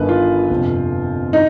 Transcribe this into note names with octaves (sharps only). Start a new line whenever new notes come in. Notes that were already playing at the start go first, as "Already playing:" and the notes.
Already playing: G1 G2 D#3 B4
F4
G1 F2 C3
D#4